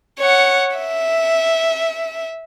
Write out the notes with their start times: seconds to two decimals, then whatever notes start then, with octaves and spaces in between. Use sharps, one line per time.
0.19 C#5 F#5
0.77 E5